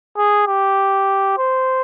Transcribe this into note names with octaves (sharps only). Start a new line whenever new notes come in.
G#4
G4
C5